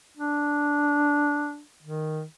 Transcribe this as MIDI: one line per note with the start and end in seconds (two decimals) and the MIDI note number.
0.17 1.61 62
1.83 2.23 51